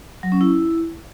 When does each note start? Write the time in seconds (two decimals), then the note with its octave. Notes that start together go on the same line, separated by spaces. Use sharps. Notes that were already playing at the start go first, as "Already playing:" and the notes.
0.23 F#3
0.32 C#4
0.41 E4